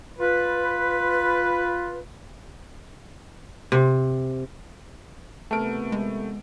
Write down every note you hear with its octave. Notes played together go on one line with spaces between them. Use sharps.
F4 B4
C3
C3 E3 A3 B3 A#4 A5 D7
G#3